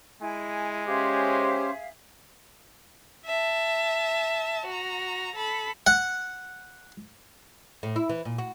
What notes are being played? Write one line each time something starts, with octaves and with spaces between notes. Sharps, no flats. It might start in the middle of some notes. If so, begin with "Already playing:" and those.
G#3 E4 G#5
C#4 G4 G#4 C5 E5 F5
E5 A5
F#4 A#5
A4 B5
F#5
A2
E4
E3
A#2
F#4